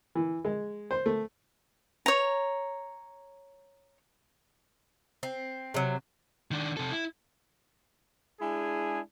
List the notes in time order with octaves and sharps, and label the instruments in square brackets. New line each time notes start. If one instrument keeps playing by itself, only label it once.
[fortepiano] E3
G#3
C5
A3
[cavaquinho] C#5 A#5
[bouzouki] C4
C3 F#3
[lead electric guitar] D#3 D4
C3 A4
E4
[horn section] G#3 D4 E4 G#4